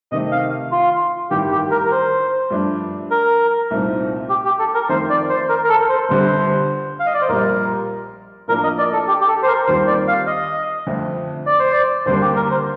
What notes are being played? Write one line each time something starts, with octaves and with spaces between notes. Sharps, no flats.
C3 D#3 A3 D#5
F5
F4
A1 G2 D#3 G3 G4
G4
A#4
A#4
C5
G2 F3 A3 D4
A#4
C2 A#2 A3 C4 D#4
G4
G4
A4
A#4
F2 D#3 A3 C4 C5
D5
C5
A#4
A#4
A4
C5
G1 G2 D3 G3 C5
F5
D#5
D5
C5
A#1 A#2 G3 A#4
A2 F3 A#3 D4 A#4
D#5
D5
A4
G4
G4
A4
C5
A#4
D#2 D#3 G3 C4 F4 C5
D5
F5
D#5
F2 D3 A3 C4
D5
C5
D5
D#2 D3 G3 A#3 C5
G4
A#4
C5